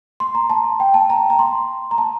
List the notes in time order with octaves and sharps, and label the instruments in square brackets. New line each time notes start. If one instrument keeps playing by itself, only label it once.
[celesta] C6
A#5
A5
G5
A5
A#5
A#5
C6
A#5
A5